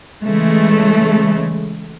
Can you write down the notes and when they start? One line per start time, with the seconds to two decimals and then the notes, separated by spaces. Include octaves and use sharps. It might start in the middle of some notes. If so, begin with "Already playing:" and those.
0.24 C#3 E3 G#3 A3